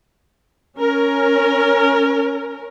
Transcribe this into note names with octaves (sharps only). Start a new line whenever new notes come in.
C#4 A#4